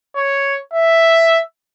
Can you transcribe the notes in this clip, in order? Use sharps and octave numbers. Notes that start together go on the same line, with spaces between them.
C#5
E5